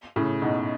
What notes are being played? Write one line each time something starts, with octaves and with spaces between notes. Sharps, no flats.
A2 C#3
G#2 B2